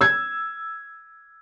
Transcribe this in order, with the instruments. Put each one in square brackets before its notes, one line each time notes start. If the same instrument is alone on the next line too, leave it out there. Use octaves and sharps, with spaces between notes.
[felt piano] E6 G#6